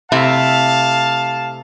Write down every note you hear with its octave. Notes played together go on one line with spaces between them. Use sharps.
C3 A3 E4 F5 A5